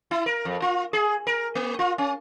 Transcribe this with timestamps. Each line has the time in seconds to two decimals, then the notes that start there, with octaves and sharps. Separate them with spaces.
0.11 E4
0.26 A#4
0.45 F2
0.62 F4
0.93 G#4
1.27 A#4
1.55 A#3
1.79 F4
1.98 C#4